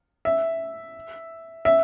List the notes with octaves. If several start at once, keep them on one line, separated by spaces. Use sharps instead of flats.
E5
E5